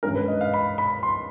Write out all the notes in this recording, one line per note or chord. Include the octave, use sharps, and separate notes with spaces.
G2 D#3 G#3 C#4 A#4
B4
D#5
F5
B5
B5
C6